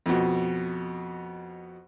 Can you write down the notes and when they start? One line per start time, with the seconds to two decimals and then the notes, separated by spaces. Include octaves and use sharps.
0.06 F2 B2